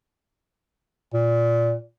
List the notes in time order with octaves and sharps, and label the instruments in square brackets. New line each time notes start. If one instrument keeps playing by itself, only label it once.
[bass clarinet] A#2